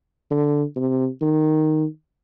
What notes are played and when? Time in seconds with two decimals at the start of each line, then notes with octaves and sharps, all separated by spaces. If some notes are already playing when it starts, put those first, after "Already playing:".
0.31 D3
0.76 C3
1.21 D#3